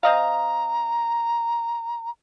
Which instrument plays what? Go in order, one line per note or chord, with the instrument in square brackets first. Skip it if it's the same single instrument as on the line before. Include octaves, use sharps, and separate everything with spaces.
[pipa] C4 D#5 F5 [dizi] A#5